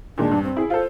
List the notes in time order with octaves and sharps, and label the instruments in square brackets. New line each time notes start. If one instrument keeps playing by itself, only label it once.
[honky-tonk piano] A#2 D#3 G#3 [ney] D4
[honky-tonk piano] G2
[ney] C4
[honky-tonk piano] E4 G#4
[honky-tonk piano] F4 A4 [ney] C5